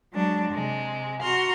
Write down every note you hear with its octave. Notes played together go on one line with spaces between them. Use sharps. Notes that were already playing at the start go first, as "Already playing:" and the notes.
F#3 G#3 D4
C3 G#3
F#4 A#5 C6 F6